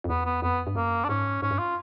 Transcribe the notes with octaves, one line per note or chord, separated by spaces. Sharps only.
F2
E2 B3
B3
F2 B3
G2
F#2 A#3
D4
G#2 C#4
G#2 C#4
G2
F4